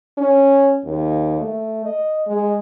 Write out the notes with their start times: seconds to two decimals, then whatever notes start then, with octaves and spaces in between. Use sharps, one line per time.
0.18 C#4
0.85 D#2
1.41 A3
1.85 D#5
2.26 G#3